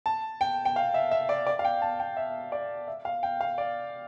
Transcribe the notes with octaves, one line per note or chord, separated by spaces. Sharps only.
A5
G5
G5
F5
E5
E5
D5
D5
F5
G5
A5
G5
E5
D5
E5
F5
G5
F5
D5